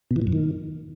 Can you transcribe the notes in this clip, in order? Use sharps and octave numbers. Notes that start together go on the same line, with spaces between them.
B2
E3
A#2
F#2
D#3